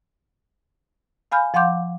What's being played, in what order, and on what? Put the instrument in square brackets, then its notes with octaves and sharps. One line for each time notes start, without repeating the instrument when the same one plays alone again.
[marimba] F5 G#5 B5 F6 G6
F3 F5 F#5 C6 D6 G6